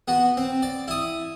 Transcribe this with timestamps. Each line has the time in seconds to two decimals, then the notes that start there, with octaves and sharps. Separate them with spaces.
0.08 B3 F#4
0.37 C4
0.62 D5
0.88 E4 D#6